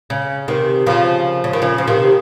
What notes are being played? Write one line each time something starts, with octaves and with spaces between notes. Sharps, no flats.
C#3
C3 D#3
C#3 F3
C#3
D#3
C#3 F3
F3
C3 D#3